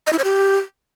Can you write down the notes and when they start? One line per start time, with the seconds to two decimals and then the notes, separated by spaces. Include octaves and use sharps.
0.07 D#5
0.13 E4
0.18 C#5
0.24 G4